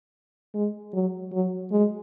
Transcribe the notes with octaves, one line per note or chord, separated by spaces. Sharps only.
G#3
F#3
F#3
G#3